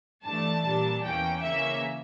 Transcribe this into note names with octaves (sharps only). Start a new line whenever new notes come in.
G2 E3 A3 D4 A5
A#2 G3 D4
E2 E3 A#3 C#4 G5
C#3 E3 A#3 C#4 E5